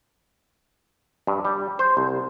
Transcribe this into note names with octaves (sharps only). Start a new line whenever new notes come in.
G2
G3
C5
C2